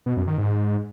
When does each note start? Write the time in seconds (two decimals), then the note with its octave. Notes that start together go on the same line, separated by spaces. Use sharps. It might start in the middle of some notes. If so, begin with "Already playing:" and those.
0.06 B2
0.17 F#2
0.27 D#3
0.38 G#2